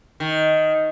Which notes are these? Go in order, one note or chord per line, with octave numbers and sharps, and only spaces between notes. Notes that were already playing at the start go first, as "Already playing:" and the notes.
D#3